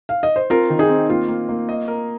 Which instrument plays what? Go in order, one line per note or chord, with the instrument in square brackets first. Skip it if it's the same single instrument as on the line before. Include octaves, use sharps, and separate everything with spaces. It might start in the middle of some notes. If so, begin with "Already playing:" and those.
[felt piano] F5
D#5
C5
[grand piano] C4 [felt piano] F4 A#4
[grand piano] D#3
[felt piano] D#4 G#4
[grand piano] C4
[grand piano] A#3 [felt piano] F4
[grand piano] A#3
A#3
D#5
A#4